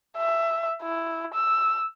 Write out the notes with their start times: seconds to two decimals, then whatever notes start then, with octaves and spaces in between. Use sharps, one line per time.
0.17 E5
0.83 E4
1.34 E6